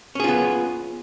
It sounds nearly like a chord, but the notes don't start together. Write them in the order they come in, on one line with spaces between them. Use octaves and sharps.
C#4 G#4 F4 B3